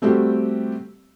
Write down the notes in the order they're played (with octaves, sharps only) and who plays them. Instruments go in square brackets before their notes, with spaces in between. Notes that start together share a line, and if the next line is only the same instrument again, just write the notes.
[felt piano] G3 A3 C4 F#4 G4